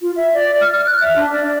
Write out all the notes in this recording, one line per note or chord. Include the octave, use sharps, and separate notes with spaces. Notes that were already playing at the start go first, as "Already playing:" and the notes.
F4
E5
D5
F6
F6
F#6
E5
D4
D5